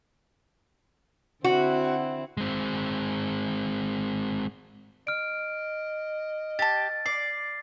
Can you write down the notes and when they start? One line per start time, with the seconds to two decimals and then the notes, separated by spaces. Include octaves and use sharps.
1.44 D3 C4 E4 F#4
2.37 G#3 C4
5.07 D#5 F6 D7
6.59 G4 A5 A6
7.06 D5 C7